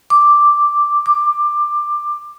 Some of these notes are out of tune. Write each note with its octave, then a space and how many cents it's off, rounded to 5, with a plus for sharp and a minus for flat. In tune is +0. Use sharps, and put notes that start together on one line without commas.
D6 +0
D6 +15